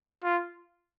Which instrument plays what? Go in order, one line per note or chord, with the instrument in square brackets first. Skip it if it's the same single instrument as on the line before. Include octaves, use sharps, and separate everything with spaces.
[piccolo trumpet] F4